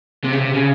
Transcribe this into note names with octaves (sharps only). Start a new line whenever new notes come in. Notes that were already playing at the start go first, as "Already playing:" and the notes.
C3
C#3
C3
C#3